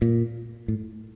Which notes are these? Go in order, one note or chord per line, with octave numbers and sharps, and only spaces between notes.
A#2
A2